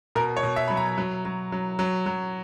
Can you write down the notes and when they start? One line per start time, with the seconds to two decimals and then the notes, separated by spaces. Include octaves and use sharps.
0.15 B2 A#4
0.37 C#5
0.43 B2
0.56 E5
0.68 F#3 B5
0.77 A#5
0.98 F#3
1.25 F#3
1.52 F#3
1.79 F#3
2.06 F#3